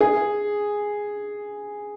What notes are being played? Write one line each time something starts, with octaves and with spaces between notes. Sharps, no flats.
G#4